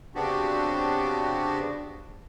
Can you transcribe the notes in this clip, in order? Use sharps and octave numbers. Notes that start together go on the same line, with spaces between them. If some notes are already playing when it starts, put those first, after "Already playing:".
C#3 B3 C4 D4 F#4 G4